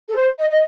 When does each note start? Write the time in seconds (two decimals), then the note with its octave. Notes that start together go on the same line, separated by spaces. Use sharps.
0.08 A4
0.15 C5
0.38 D#5
0.50 D#5